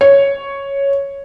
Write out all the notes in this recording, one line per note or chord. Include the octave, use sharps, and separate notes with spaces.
C#5